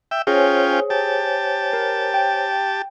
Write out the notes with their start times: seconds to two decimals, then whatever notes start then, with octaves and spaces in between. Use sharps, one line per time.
0.11 E5 G5
0.27 C#4 F4 G#4 C5 C#5 G5 G#5
0.90 G4 A5
1.73 A#4
2.14 G5